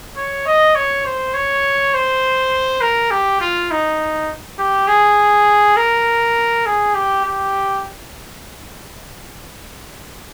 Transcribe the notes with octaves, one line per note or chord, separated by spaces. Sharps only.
C#5
D#5
C#5
C5
C#5
C5
A#4
G4
F4
D#4
G4
G#4
A#4
G#4
G4
G4